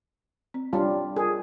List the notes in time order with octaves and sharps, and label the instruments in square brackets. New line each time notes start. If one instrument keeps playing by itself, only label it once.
[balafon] C4
[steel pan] G3 F4 [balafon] D4 C#5 A5
[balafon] F4 A#4 [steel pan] G#4